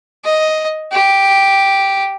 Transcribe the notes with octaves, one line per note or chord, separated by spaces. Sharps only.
D#5
G4